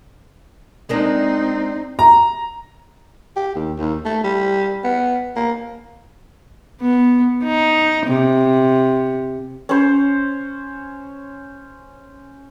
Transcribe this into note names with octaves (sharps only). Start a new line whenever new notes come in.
G#3 A#3 C4 D4 D#4
A#5
G4
D#2
D#2
A3
G3
B3
A#3
B3
D#4
C3
C#4 C5